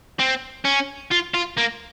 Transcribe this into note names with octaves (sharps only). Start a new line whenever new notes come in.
C4
C#4
F4
F4
A#3